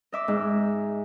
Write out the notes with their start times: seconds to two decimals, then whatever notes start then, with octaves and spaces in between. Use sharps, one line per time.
0.12 D#5 E5 D6
0.28 G#2